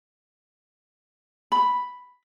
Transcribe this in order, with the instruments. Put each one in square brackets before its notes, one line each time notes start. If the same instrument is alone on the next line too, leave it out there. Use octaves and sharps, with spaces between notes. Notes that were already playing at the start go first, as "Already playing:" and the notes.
[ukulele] B5